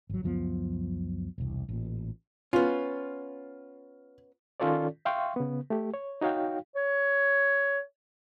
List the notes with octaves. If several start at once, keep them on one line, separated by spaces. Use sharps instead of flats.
G#1 F#3
C#2 F#2 F3 B3
E1 C2
A1 A#2
B3 C#4 F4
D#3 C#4 F4 A4 C#5 D5
E5 F5 G5 C6 C#6
C#3 B3
A3 G4
C#5
D#4 F#4 C#5 F5 G5
C#5